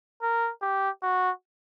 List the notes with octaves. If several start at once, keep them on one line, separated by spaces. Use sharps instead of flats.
A#4
G4
F#4